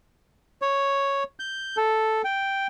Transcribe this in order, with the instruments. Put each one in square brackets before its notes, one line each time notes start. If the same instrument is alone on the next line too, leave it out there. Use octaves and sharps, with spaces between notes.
[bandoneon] C#5
G6
A4
G5